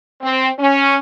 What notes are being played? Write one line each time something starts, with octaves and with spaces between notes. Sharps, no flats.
C4
C#4